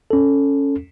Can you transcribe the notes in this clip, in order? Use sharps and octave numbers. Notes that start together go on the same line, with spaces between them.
C#4 A4